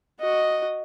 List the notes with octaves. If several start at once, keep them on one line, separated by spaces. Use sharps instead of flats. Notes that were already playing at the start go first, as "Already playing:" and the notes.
F#4 D#5